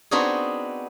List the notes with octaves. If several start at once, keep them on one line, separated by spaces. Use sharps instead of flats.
B3 C4 D4 D#4 F#4 G#4